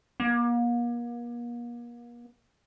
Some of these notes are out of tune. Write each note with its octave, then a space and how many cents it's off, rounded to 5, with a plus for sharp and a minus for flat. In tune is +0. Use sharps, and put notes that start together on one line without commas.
A#3 +40